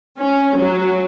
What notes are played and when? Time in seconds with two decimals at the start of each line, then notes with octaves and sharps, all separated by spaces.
0.19 C#4
0.57 F#3